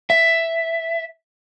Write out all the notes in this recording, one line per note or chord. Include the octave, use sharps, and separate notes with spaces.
E5